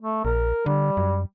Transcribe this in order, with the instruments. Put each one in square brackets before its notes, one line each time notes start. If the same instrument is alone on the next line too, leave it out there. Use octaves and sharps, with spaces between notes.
[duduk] A3
[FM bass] A#1 [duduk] A#4
[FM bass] D3 [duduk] G3
[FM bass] F#2